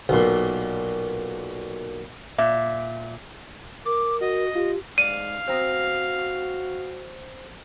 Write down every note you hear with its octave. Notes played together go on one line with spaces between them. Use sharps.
B1 A#2
A#2 E5
A#4 D6
F#4 D#5
F4 G4
G#2 D5 F5 D#7
C4 F#4 A#5 D#6